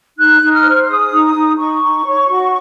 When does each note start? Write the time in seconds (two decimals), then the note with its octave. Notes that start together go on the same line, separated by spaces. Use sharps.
0.17 D#4 F#6
0.41 D#4
0.52 F6
0.64 C5
0.82 F6
0.87 G#4 D#6
1.11 D#4
1.35 D#4
1.58 D#4 C#6
1.82 D#4
2.04 C#5
2.28 F#4